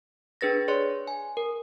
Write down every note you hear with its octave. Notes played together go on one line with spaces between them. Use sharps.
D4 G#4 B4 A6 A#6
G#4 C#5 D5 C6
G#5
A#4